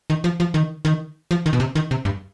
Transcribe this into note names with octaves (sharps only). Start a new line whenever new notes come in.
D#3
F3
F3
D#3
D#3
F3
D#3
B2
C3
D#3
C3
G2